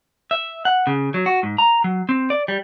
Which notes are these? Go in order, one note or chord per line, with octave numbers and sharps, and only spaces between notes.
E5
F#5
C#3
F#3
F#4
G#2
A#5
F#3
C4
D5
G3